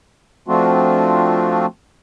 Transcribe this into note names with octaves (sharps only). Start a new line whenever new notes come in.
F3 A3 C4 D4 F4 F#4